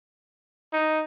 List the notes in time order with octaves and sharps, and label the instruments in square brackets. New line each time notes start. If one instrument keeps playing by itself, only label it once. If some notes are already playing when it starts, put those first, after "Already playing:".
[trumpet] D#4